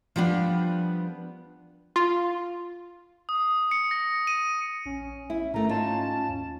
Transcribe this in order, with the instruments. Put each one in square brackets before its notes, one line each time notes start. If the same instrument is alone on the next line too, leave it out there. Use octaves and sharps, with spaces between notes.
[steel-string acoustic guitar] F3 G3 B3 D4
[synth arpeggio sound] F4
[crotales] D#6
C#7
A#6
D#7
[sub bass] A#1 [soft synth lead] C#4
[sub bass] A1 [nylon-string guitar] E4
[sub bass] G#2 [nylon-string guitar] D#3 A3 [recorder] A#5
[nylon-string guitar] D#4 F4 C#5 [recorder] A5
[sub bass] D#2